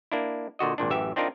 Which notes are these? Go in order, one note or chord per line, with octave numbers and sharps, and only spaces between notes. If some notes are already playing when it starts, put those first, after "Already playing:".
A#3 D4 E4
A#2 D3 F#4 D#5
G#1 A#2 D4
A1 F#2 E3 G4 E5
C4 D4 D#4 F4 A#4